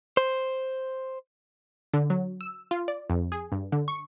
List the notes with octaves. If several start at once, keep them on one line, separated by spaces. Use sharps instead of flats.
C5
D3
F#3
E6
F4
D5
F2
G#4
G2
D3
C#6